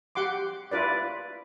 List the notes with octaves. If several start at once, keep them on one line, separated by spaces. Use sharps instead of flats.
G4 F#5 C6 D6
E4 F4 B4 D5